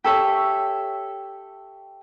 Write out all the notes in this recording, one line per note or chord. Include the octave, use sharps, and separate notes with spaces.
G4 A4 C#5 E5